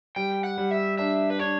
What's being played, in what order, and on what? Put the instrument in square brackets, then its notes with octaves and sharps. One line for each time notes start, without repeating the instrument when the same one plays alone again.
[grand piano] G3 [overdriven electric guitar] G5
[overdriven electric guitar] F#5
[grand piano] G3
[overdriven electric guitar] E5
[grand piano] D4 [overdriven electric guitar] E5
[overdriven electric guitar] B4
[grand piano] D4 [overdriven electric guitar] C#5